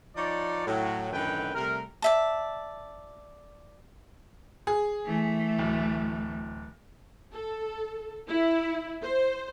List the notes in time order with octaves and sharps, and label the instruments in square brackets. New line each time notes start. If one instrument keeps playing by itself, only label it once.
[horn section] F3 D#4 C#5 D5
A2 F#3
F#2 A2 D3 D#3 B4 G5
C3 G3 A3 A#4
[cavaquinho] D5 E5 A5
[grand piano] G#4
[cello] E3 A3
[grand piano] D1
[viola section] A4
E4
C5